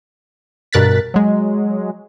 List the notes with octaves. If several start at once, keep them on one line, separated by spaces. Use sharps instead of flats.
G2 B2 A#4 F#6 A6 B6
F#3 G#3